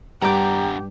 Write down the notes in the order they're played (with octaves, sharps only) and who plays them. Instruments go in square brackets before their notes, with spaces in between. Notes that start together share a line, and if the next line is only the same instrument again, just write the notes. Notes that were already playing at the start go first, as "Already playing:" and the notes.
[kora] G2 G5 [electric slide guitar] G3 D4 F#5 [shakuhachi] G4 [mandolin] A#5 D6